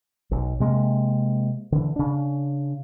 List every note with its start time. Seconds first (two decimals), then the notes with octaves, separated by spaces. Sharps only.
0.31 B1
0.60 C3 G#3 A#3
1.72 D3 E3
1.96 C#3 D4